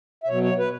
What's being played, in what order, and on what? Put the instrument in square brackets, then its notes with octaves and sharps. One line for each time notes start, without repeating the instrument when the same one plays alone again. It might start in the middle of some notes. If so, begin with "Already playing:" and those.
[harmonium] E5
B2 F#3 C#5
C#5
B4